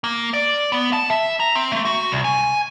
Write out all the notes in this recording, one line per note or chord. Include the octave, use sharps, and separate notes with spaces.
A#3
D5
B3
A5
E5
A#5
C4
A3
F#4
C2
G#5